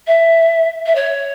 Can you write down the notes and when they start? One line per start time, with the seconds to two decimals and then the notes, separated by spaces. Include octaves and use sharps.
0.07 E5
0.86 E5
0.95 C#5